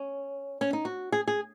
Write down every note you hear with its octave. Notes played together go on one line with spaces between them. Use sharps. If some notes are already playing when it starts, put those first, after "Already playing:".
Already playing: C#4
C#4
D#4
F#4
G#4
G#4